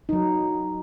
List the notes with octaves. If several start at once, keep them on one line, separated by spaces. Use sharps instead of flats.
F#3 D#4